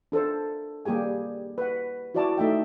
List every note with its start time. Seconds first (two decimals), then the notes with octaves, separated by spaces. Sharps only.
0.12 D4 A4 A#4 C5
0.85 G3 A#3 G4 G#4 G#5
1.58 B4 F#5
2.14 E4 F#4 C5 D5 G#5 A5
2.37 A3 D#4 E5 G5